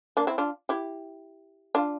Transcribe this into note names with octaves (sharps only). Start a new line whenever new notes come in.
A#3 D4
C4 E4
D4 F4
E4 G4
D4 F4